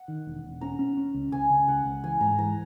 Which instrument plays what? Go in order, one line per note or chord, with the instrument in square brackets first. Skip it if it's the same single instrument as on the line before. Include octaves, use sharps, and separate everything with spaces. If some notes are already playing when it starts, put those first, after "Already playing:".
Already playing: [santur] F#5
[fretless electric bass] D#3
E1
E1
[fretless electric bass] C#4 [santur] A#5
[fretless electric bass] C#4
C#4
C#2
[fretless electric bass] C#2 [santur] G#5
[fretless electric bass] C#3
[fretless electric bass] C#2 [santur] F#5
[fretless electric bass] C#2
[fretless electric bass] E3 [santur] G#5
[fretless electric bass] G#2 [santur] A#5
[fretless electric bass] E3 [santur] A#5